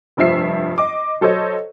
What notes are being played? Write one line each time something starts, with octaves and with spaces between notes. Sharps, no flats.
F1 G2 F3 E5 C7
D#5 D6
F#3 A4 C5 C#5 D#5